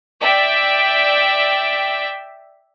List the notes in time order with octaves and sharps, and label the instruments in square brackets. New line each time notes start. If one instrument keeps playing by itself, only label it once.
[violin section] D5 E5 G5